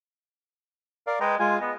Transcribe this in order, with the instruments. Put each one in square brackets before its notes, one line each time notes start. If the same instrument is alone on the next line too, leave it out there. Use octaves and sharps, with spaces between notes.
[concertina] A#4 D5 F5
[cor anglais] G#3 [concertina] B4 G5 A#5
[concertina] G#3 F4 [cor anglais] G#5
[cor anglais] B3 [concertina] D#5